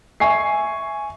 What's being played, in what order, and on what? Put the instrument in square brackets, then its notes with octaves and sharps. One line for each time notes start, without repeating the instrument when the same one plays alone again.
[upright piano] E5 G#5 C#6 C7